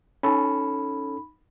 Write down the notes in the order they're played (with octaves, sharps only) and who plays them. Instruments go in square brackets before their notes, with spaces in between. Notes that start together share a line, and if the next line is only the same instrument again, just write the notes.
[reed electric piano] C#4 A4 [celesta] D#4 B5